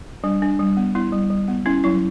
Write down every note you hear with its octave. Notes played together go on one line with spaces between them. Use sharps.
G3 D4
D4
G3
B3
B3 E4
G3
G3
B3
C#4 E4
F#3 E4